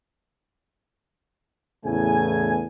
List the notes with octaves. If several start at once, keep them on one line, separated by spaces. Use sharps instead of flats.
E2 A2 C#3 A3 B3 G#5